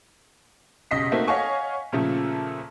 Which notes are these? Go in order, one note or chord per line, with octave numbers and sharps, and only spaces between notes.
F1 B1 C#3 D#5 B6 C7
A3 A#3 C4 D#4 F#4 F#5
C#5 D#5 F5 F#5 G#5 C#6
A#2 C#3 F3 A3 A4